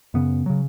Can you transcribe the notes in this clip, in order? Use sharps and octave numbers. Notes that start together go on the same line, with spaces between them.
F#2 C#3 B3
C#3 F#3